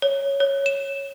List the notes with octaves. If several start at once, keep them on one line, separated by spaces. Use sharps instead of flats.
C#5
C#5
E7